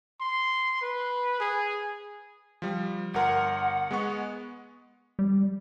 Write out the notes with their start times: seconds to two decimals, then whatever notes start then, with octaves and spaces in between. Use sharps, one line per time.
0.21 C6
0.81 B4
1.40 G#4
2.62 F3 G3
3.14 G1 A#4 F#5 C6
3.91 G#3 B3 C#6
5.19 G3